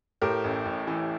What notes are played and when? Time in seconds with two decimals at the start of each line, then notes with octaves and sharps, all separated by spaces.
0.22 A2 G4 A#4
0.44 A1
0.65 A1
0.87 E3